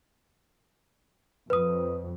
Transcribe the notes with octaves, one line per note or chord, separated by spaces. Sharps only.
F2 B4 D#6